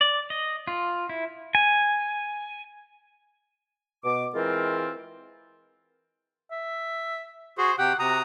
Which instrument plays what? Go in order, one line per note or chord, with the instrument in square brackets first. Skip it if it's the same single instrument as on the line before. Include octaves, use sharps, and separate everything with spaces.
[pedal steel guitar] D5
D#5
F4
E4
G#5
[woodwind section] B2 D6
E3 G#3 C4 F4 A#4
[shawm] E5
[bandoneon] F#4 G#4 [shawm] C5
[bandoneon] C3 G4 G5 [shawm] F#5
[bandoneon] C3 A#5 D#6 [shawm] F#4